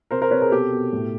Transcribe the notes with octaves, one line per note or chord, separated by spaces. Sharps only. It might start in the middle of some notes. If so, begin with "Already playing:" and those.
C3 A#4 C5
A#4 C5
C3 B4 C#5
G#4 A#4
B2 G4 A4
B2
A2